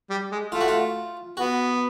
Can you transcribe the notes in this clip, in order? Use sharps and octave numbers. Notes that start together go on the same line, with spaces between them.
G3
G#3
A3 F4
F#4
F4
B3 F#4